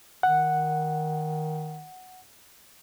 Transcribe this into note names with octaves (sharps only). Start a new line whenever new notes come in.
D#3 F#5